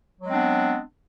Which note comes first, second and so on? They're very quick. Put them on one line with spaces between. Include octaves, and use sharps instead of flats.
F#3 G#3 C4 D4 B3